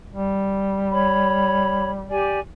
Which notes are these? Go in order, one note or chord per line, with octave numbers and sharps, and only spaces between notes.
G3
C#5 B5
G4 D5 G#5